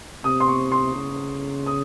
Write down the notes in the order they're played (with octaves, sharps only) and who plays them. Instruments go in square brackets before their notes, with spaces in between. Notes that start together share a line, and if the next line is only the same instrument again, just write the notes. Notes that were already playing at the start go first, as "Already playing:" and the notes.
[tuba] C3 [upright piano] D#6
[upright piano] C6
C#6
C6
[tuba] C#3
[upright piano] D#6